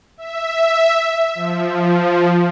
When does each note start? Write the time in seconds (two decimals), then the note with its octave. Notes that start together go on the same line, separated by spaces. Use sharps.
0.17 E5
1.35 F3